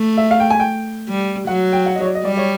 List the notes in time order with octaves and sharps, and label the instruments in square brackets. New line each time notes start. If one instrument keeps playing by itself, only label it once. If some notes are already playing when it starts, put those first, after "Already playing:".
Already playing: [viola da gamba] A3
[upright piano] E5
F5
G5
G#5
G5
[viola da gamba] G3
[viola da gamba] F#3 [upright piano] F#5
[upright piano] G5
F#5
D#5
C#5
D5
D#5
[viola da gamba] G3 [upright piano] D5
[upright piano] C#5